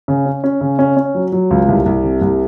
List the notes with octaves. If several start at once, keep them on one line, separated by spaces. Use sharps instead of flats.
C#3
C#4
C#4
C#3
C#4
C#4
F#3
F#3
C#2
C2
C2
C3
C2